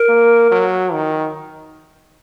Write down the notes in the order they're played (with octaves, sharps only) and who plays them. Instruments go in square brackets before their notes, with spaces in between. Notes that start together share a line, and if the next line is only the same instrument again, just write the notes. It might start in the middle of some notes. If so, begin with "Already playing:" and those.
Already playing: [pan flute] A#4
[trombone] A#3
F#3
D#3